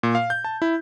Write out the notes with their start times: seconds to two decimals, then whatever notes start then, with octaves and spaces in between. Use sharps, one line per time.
0.03 A#2
0.15 F5
0.30 G6
0.44 A5
0.62 E4